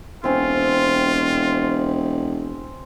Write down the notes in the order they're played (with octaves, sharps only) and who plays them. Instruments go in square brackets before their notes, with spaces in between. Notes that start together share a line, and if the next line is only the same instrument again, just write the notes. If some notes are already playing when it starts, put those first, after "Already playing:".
[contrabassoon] E1 [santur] C4 C#4 C5 [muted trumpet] F4